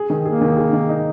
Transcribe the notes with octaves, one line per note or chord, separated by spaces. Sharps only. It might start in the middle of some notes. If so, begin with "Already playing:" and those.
Already playing: G#4
D#3
A#3 G#4
D#3
G#4
D#3
D#4